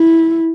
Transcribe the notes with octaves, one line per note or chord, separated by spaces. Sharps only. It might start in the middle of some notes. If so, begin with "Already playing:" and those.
Already playing: E4